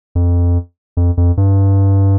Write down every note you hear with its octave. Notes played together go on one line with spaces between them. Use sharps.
F2
F2
F2
G2